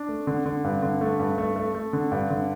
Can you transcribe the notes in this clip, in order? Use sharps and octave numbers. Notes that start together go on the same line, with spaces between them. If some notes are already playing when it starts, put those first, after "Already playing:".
Already playing: D4
A3
D3
D3
G2
D3
A3
G2
A3
A3
A3
D3
G2
D3